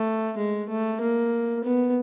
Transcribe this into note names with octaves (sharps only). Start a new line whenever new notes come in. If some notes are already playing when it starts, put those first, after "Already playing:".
Already playing: A3
G#3
A3
A#3
B3